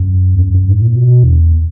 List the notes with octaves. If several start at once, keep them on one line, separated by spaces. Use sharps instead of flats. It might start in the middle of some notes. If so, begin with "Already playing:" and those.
Already playing: F#2
E2
F#2
F#2
G#2
A#2
B2
E2